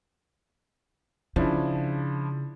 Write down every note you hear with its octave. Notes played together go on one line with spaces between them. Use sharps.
C#3 F3 D4 E4